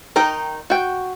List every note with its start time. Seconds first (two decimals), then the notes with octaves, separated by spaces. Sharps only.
0.16 D#3 D#4 G5 A#5
0.70 F#4 G5